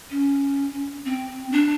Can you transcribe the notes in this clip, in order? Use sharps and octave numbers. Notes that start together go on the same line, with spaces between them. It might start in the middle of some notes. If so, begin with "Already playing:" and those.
C#4
C4
D4